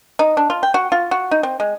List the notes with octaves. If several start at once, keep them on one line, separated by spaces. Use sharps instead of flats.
D#4
D4
F4
G5
F#4
F4
F#4
D#4
C4
G#3